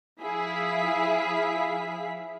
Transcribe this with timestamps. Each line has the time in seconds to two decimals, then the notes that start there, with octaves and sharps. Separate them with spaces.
0.22 F3 E4 G#4 E5 F5 B6